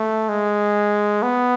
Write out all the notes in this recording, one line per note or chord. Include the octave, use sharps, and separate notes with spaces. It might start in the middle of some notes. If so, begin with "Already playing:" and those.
Already playing: A3
G#3
B3